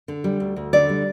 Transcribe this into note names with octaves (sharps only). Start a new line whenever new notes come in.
D3
G3
D2
D2
D3 D5
G3